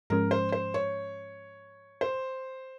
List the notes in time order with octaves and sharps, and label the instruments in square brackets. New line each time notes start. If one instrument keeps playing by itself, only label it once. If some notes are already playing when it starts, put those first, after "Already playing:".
[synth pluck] G#2 F3 G#3 C#4 [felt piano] A#4
[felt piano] C5
C5
C#5
C5